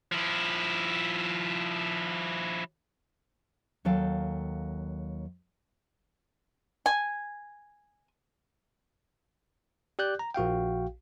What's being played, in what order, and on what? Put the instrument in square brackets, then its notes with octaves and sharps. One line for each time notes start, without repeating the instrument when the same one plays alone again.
[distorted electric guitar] F3 E4
[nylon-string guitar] D#2 F#3 A4 F5 G5
[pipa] G#5
[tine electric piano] G4 D5 F#6 G6
A#5
A#1 F#4 F5 G5